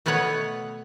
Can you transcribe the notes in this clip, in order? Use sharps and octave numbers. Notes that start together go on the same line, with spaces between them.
B2 A3 B3 B4 C#5 F#5